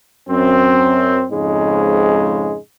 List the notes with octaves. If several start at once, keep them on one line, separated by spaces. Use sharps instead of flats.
F#2 C4
F2 G#2 C#3 G#3